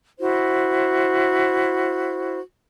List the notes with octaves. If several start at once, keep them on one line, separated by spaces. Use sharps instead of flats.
E4 F#4 C5